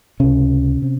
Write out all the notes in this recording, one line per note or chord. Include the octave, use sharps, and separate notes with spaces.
C#2 C3 C#4
C3